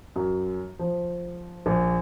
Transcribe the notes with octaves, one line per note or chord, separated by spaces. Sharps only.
F#2
F3
A#1